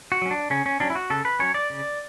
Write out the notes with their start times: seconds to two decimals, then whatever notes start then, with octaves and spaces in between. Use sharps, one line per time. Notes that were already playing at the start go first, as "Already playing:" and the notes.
0.12 F#4
0.22 F#3 C#4
0.31 D4
0.50 C#3 C#4
0.66 C#4
0.80 F#3 C#4 D4
0.90 E4
0.95 F#4
1.10 C#3 A4
1.25 B4
1.39 F#3 C#4 C#5
1.54 D5
1.70 C#3